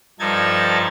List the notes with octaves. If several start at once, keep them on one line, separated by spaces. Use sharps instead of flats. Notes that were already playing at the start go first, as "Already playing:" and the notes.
G2 F3 D#4 A4 G#6 A6